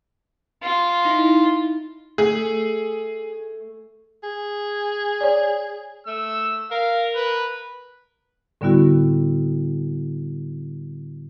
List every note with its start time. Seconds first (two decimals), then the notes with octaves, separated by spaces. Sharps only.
0.62 F4
1.05 D#4 E4
2.18 A3 G#4
4.23 G#4
5.21 C#5 D5
6.07 A3 E6
6.71 A#4 F5
7.16 B4
8.61 A2 D3 G3 B3 E4 F#4